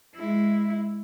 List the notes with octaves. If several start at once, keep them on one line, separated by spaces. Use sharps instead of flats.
G#3 E4